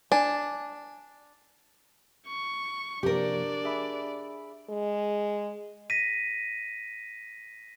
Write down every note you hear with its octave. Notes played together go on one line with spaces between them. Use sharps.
D4 G#5
C#6
C3 F3 A#3 D4 G4 A#4 D5
G#4 E5 B5
G#3
A#6 B6 D#7